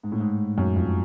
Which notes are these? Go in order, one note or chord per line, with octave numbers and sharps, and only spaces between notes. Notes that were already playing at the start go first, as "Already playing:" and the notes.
G#2
A2
G#2
F#2
F2